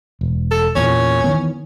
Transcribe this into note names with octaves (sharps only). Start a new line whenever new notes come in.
E1
A4
E2 A#2 C#4
D#3 E3 B3